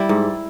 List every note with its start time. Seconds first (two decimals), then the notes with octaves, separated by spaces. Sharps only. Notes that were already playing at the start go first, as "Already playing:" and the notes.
Already playing: G3 E4
0.09 G#2